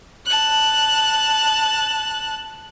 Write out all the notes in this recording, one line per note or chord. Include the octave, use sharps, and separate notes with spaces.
A5 F#6